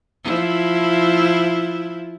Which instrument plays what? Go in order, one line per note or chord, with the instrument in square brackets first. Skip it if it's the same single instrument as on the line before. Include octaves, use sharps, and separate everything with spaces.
[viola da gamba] F3 E4